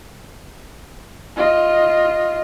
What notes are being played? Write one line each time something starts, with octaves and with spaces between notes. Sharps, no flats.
F4 D#5